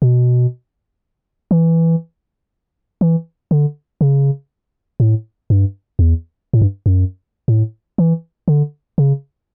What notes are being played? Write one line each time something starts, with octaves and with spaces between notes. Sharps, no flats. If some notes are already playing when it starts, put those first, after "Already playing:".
B2
E3
E3
D3
C#3
A2
G2
E2
A2
G2
F#2
A2
E3
D3
C#3